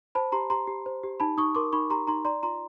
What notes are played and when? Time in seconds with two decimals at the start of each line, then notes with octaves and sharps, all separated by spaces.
0.15 C5 A5 B5
0.32 G4 A#5 C6
0.50 G4 A#5 C6
0.67 G4
0.86 C5
1.03 G4
1.20 D#4 A5 B5
1.38 D#4 C#6 D#6
1.55 A#4 C6 D6
1.73 D#4 B5 C#6
1.90 G4 A#5 C6
2.07 D#4 A#5 C6
2.25 D5 A#5 C6
2.43 F4 A#5 C6